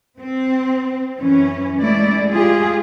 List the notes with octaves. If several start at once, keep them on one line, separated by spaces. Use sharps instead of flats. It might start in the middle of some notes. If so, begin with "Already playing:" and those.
C4
F#2 E3 C#4
G#3 A3 E4 D5
G#3 F4 G4 G#4